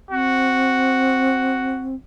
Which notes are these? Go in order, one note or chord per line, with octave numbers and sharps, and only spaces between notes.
C4 F#4